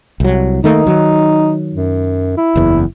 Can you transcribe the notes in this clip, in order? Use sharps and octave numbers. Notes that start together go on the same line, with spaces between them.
C2 F#3
D#3 A3 A#3 D#4
D#3 F#3
F#2
E4
F#1 E2